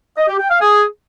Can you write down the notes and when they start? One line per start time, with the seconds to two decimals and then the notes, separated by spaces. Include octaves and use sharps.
0.18 D#5
0.28 G4
0.39 G5
0.50 F5
0.61 G#4